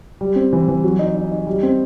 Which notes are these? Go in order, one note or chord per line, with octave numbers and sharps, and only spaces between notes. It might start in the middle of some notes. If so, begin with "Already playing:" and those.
G3
C4
E3
E3
F#3
D#4
D#4
D#4
G3
C4